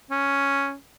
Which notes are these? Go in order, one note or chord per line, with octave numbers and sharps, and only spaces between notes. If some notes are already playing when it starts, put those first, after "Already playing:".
C#4